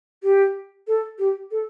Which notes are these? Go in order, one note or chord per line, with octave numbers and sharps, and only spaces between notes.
G4
A4
G4
A4